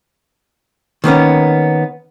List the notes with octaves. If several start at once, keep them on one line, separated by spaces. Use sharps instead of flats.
D#3 A#3 B3 C#4